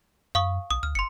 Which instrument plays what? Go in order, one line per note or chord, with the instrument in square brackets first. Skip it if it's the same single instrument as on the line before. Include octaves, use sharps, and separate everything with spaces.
[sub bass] F#2 [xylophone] F5 C#6 D#6
[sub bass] B1 [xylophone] D#6
[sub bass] D2 [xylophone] F6
[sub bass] G1 [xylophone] C6 C#7